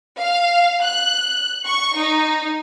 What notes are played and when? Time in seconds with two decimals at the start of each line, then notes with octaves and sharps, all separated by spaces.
0.18 F5
0.82 F#6
1.65 C#6
1.97 D#4